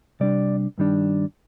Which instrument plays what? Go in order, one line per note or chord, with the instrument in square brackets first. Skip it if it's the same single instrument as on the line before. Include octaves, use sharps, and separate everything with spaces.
[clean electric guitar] C3 G3 D4 D5
G2 D#3 G3 D4